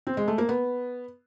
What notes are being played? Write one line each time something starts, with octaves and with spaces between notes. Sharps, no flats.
C4
G#3
A3
A#3
B3